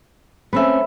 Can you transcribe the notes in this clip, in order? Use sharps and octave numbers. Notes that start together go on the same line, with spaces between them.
A3 C4 C#4 B4 E5